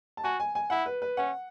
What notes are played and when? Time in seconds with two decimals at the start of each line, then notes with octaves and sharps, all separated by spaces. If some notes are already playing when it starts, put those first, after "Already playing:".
0.17 A5
0.24 F#4 G#5
0.40 G#5
0.55 G#5
0.70 E4 F#5
0.86 B4
1.02 B4
1.17 C#4 F#5